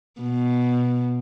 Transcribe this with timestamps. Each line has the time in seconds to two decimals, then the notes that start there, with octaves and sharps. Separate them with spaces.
0.21 B2